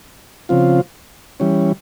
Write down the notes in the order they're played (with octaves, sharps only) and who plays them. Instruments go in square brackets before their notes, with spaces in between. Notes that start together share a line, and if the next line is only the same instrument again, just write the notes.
[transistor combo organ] C#3 F3 C4 F4
E3 G3 C#4